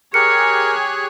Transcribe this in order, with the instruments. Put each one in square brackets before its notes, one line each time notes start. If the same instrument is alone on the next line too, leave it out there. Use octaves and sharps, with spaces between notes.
[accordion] G4 G#4 F#6 [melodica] A#4 [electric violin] C#5 G#5 [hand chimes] C#7